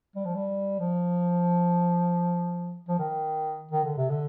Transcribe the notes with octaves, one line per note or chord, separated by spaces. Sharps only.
G3
F3
G3
F3
F3
D#3
D#3
D3
C3
D3